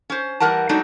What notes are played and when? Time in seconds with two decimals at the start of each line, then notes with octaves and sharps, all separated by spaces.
0.10 C#4 C5
0.40 E3 G3 A#4 F#5 A5
0.69 F#3 G#3 A3 C4 D4 D#4